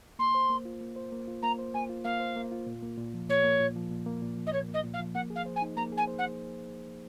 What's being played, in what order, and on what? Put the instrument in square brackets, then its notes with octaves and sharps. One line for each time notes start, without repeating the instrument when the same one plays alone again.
[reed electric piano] A#3 [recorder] C6
[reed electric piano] C5
A#3
F4
A#3
C5
A#3
F4
[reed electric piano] A#3 [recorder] A#5
[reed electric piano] C5
[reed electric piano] A#3 [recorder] G#5
[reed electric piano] F4
[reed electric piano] A#3 [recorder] F5
[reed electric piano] C5
A#3
F4
A#2
A#3
A#2
F3
[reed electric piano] A#2 [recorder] C#5
[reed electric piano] A#3
A#2
F3
A#2
A#3
A#2
F3
[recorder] D#5
[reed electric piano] A#2 [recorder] C#5
[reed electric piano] A#3
[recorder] D#5
[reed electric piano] A#2
[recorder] F5
[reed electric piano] F3
[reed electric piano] A#3 [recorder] F#5
[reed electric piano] G#4
[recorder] F5
[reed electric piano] C5
[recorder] G#5
[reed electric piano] D#4
[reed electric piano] A#3 [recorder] A#5
[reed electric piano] G#4
[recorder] G#5
[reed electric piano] C5
[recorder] F#5